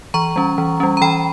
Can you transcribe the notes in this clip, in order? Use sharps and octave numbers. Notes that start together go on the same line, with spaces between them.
E3 A#5 C#6
G3 C#4
E3
G3 C#4
A#5
E3 G5 B5